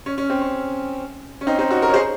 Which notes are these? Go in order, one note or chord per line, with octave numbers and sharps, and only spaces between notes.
C#4
C#4
C4
C#4
C#4
C4 D#4
C4 D#4
D#4 F#4
F#4 A#4
C#5
G#4 C5